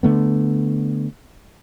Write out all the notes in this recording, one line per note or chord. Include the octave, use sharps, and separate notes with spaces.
D3 A3 B3